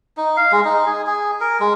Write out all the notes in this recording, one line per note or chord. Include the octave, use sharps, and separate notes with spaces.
D#4
F5
G#3
D#4
G#4
G#4
A#4
G#3